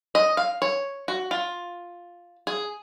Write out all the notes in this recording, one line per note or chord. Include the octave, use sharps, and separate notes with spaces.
D#5
F5
C#5
F#4
F4
G#4